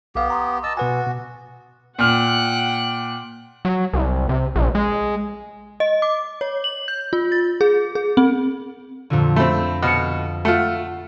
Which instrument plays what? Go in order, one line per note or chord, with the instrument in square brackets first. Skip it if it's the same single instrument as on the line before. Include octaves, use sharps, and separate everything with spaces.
[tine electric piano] B1 F5 [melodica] B3 G4
[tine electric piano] A#5 C6 D#6
[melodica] D#5 A5 E6
[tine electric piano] B2 B4 G#5 [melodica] F#4
[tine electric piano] B2
[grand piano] A#2 F6 [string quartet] F#5 G5 F#6
[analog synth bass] F#3
C2
C3
A#1
G#3
[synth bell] D#5
D6
C#5
F#7
G6
F4
A6
G#4
G#4
C4
[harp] F2 A#2 D3
[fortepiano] A3 C4 [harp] B5
[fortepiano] B2 [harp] F6 C#7
[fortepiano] A3 F4 [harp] F#5